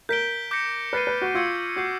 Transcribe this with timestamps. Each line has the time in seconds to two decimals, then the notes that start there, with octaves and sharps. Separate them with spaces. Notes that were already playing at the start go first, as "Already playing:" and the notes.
0.09 A#4 G6 B6 D7 G7
0.51 D6 G6 A#6 C#7
0.93 B4 F6 A6 C7 D#7
1.07 B4
1.22 F#4
1.34 F4 C#6 E6 G#6 C#7
1.76 F#4 D6 G6 C7